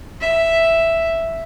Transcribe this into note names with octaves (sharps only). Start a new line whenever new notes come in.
E5